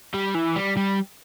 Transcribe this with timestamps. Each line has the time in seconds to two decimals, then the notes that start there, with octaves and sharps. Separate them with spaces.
0.14 G3
0.34 E3
0.56 G3
0.77 G3